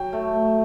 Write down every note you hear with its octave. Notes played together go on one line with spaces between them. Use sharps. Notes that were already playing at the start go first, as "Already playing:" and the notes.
Already playing: F#3 G5
A3